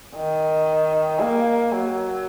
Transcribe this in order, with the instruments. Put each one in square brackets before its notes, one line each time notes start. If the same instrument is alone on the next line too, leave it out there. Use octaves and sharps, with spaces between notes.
[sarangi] D#3
A#3
F#3